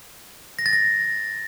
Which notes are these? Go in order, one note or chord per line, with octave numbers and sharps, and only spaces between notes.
A#6
A6
A#6